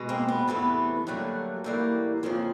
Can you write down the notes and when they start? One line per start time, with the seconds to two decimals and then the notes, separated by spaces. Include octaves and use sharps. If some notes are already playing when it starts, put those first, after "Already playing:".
Already playing: B2 G#3
0.09 A#3 C4
0.29 B3
0.48 E2 C3 E3 A3 B3
1.07 G2 D3 F#3 A3 A#3
1.64 A2 E3 G3 A#3
2.23 F2 C#3 F3 A#3